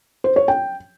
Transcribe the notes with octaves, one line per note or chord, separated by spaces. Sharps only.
C5
C#5
G5